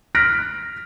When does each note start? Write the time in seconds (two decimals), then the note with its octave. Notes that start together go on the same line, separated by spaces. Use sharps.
0.15 F6 F#6 A#6 B6 D7